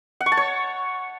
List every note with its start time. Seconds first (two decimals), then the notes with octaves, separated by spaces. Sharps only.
0.21 F#5
0.26 C#6
0.32 A5
0.37 C#5